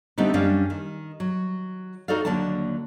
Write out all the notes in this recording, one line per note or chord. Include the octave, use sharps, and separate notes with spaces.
D3 G3 A3 B3 C4 D#4
F#2 G3 C#4 D4 F5
D#3
F#3
D#4 F#4 A4 D5 F5
D#2 D3 F#3 A#3 D4 A5